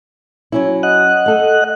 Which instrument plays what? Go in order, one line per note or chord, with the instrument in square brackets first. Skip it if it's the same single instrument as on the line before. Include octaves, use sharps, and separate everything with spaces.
[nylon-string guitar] F#3 C#4 E4
[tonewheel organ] D#5 F#5 F#6
[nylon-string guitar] A3 A4